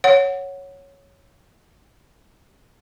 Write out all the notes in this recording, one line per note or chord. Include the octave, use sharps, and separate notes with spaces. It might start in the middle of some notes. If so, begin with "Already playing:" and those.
C#5 F#5